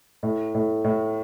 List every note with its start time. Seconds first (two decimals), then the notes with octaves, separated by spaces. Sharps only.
0.23 A2
0.55 A2
0.84 A2